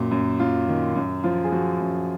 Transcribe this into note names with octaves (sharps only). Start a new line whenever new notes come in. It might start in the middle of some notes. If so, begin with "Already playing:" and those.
Already playing: F#2 A#2 F#4
F#2
F#2 F4
D#3
F#2
F3 F4
G#4
F3 F#4
F#2